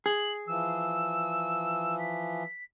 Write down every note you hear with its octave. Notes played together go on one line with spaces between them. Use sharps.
G#4 F#7
E3 F3 E6
B6